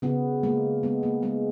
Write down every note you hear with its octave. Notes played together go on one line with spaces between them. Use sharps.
C#3 B3
G#3 A#3
G#3 B3
A#3
G#3 B3